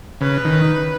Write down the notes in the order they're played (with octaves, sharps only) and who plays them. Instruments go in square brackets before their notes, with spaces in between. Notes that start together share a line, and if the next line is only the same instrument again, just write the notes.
[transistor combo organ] C#3 [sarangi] B4
[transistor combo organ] D#3